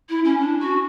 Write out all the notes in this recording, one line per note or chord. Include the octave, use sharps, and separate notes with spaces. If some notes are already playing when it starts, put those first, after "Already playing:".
E4
C#4
D4
F#4